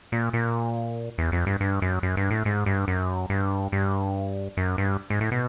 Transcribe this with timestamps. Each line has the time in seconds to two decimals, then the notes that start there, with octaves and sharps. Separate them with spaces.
0.12 A#2
0.33 A#2
1.18 E2
1.32 F2
1.47 G2
1.61 G2
1.82 F#2
2.03 F#2
2.17 G2
2.31 A2
2.45 G#2
2.66 G2
2.88 F#2
3.30 G2
3.72 G2
4.57 F#2
4.78 G2
5.10 G#2
5.21 A2
5.32 B2